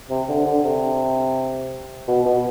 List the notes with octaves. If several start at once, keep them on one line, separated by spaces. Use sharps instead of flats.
C3
D3
D3
C3
B2
B2